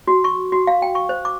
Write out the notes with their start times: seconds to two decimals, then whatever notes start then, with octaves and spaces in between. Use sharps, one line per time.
0.07 F#4
0.24 C#6
0.52 F#4
0.67 F5
0.82 G5
0.95 C#6
1.09 C5
1.25 D6